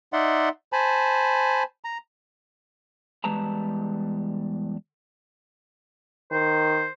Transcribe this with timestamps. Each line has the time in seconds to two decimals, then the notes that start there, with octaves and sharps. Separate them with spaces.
0.13 D#4 D5 E5 F#5 C6
0.73 C5 G#5 A5 B5
1.85 A#5
3.24 E2 G3 G#3 B4 A5 A#5
6.31 D#3 C5